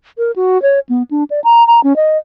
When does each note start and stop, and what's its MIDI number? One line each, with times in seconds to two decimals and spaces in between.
0.18 0.31 70
0.36 0.61 66
0.62 0.80 73
0.89 1.03 59
1.11 1.24 62
1.30 1.40 74
1.44 1.65 82
1.67 1.80 82
1.84 1.96 61
1.96 2.18 75